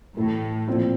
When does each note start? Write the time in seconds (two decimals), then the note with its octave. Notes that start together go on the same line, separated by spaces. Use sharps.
0.16 A2 E3 A3 E4
0.68 A#2 F3 C4 E4